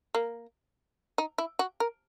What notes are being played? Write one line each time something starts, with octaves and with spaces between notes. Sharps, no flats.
A#3
D#4
E4
F#4
A#4